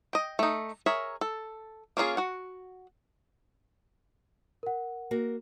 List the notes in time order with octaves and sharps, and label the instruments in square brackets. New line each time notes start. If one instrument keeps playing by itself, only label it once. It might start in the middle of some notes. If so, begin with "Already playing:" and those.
[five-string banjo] D#5 G5
A3 D#4
G#4 A#4 C#5 E5
A4
A#3 C#4 D4 F4 G#4
F#4 F#5
[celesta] A#4 F#5
[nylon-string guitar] A#3 F#4 A#4